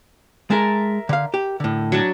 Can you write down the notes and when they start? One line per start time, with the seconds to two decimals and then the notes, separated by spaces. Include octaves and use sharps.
0.50 G#3 A#4 E5 A5
1.09 D3 F5
1.34 G4
1.60 A2 D3
1.92 F#3 D4 A5